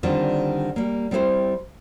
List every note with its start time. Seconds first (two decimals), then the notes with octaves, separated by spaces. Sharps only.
0.03 D3 D#3 G3 C4 F4
0.76 G3 A#3
1.11 G3 C4 E4 A#4 C5